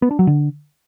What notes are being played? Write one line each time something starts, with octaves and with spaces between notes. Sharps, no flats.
B3
D4
F#3
D3